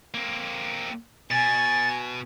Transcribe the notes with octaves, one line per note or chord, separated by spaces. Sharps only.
A#3 C4
B2 G#5 A6